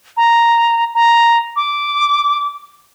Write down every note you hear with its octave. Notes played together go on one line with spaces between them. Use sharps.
A#5
A#5
D6